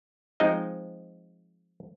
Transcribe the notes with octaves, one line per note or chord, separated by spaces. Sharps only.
F3 G#3 C4 D#4 D#5